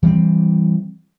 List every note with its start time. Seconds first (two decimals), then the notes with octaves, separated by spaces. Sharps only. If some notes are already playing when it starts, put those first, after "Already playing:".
0.03 E3 G3 G#3 C4